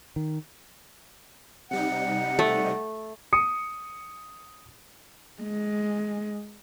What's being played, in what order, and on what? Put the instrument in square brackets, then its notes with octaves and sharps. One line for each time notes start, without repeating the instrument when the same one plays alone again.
[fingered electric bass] D#3
[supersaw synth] C3 G3 D#4 [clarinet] F#5
[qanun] A3
[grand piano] D#6 C#7
[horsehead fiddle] G#3